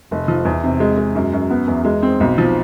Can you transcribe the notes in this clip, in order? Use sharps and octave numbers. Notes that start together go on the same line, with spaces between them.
F1
F3
E2
C3
G#3
G#3
F#2
F#2
B3
E2
G#3
C4
B1
F3